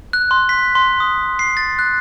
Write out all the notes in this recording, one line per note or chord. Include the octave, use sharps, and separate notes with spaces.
F#6
C6
B6
C6
D#6
C7
A6
F#6